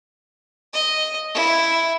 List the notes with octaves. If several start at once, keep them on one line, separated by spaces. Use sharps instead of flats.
D#5
E4